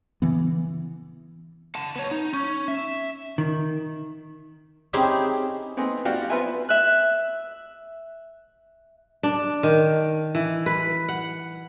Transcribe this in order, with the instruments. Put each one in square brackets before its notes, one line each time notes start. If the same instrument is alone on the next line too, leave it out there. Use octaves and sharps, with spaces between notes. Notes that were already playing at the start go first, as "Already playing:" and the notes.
[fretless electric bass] C#3 E3 B3
[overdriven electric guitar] F#5 A5
B3 C#5
D#4
C#4
E5
[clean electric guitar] D#3
[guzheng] C4 C#4 D#4 E4 G4 G#4
[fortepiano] B3 C4 D#4 G#4
F#4 G4 D5 F5 G5
B3 F4 B4 C5 E5 G#5
[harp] E5 F#6
[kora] D4
D#3
E3
B4
F#5